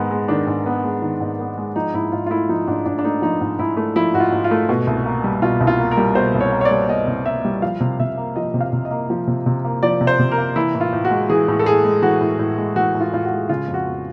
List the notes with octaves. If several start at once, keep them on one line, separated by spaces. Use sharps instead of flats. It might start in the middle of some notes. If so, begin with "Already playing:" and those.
Already playing: G#2 D#3 G#3 B3
G#3
D#3 D4
G#2
B3
G#3
D#3
G#2
B3
G#3
F3 D#4
G#2 E4
G#2 F4
F4
A3 E4
F3 D#4
G#2 D4
G#2 D4
D4
A3 D#4
F3 D#4
G#2
G#2 E4
A3
F3 E4
G#2 F#4
F4
G#2
F4
A3
B2
C2
A#3
G3
B2 F4
C2
F4
A#3
A#4
G3
B2 C5
C2
C#5
A#3
C#5
D5
G3
B2 D#5
C2
A#3 E5
G3
F3 F5
C3
C3 E5
A#3
F3 D#5
C3
F5
C3
D#5
A#3
F3
C3
C3
A#3
F3 D5
C3
C5
C3
A#4
A#3
E3 E4
A2
F4
A2
F#4
G#3
E3 G#4
A2
A4
A2 G#4
G#3
E3 F#4
A2
A2
G#3
E3 F#4
A2
F4
A2 F4
F#4
G#3
C#3 F4
F2
F#4
B3